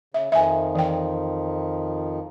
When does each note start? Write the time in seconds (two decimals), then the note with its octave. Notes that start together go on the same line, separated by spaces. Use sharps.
0.14 C#3 E5
0.32 F2 D#3 F3 E5 G#5
0.75 E3 G5